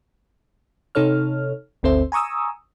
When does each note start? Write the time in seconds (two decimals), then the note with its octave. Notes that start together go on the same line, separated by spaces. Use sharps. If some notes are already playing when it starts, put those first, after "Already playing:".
0.95 C3 D#4 A4 C#5 F6
1.83 G1 D2 C4 A4 C5 E5
2.12 G#5 A#5 C#6 D#6 E6